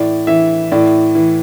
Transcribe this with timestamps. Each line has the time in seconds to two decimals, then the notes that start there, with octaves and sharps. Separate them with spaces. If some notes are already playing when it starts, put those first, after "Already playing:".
Already playing: A2 E3 D5
0.27 E3 E5
0.71 A2 D5
1.15 E3